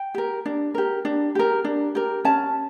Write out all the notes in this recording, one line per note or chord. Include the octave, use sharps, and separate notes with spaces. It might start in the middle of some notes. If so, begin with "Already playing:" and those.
Already playing: G5
G4 A#4
D4
G4 A#4
D4
G4 A#4
D4
G4 A#4
C#4 A5